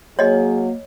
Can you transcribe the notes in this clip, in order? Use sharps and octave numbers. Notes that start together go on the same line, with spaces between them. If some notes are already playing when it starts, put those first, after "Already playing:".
F#3 A#3 G#4 C#5 D#5